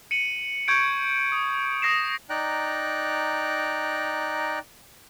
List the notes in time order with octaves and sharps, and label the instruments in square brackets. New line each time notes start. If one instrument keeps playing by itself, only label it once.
[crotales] C#7 D#7 F#7
C#6 G6 G#6 C#7 D7
D#6
D#6 A#6 C7 E7
[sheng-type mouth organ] D#4 D5 G5 A#5 F#6